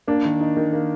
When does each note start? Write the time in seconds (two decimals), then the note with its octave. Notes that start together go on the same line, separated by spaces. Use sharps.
0.08 A#3 D4
0.25 D#3
0.41 D#4
0.57 D#3
0.73 A#3